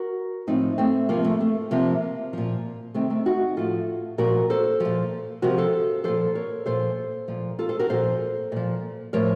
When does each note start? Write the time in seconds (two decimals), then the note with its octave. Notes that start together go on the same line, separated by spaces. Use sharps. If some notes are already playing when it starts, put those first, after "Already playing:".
Already playing: F#4 A#4
0.47 A2 F3 C4 D#4
0.78 A3 C4
1.09 C3 F3 A#3
1.24 A3
1.41 A3
1.71 C3 F3 A#3
2.33 A#2 F3
2.94 C3 D#3 A3 C4
3.10 A3 C4
3.26 D#4 F#4
3.57 A2 F3 F4 A4
4.18 A#2 F3 F#4 A#4
4.50 A4 C5
4.80 A#2 F3
5.42 C3 F3 F#4 A#4
5.58 A4 C5
6.04 A#2 F3 A4 C5
6.35 A#4 C#5
6.66 A#2 F3 A4 C5
7.28 A#2 F3
7.59 F4 A4
7.69 A4 C5
7.79 F#4 A#4
7.90 A#2 F3 A4 C5
8.52 A#2 F3
9.13 A2 F3 A#4 C#5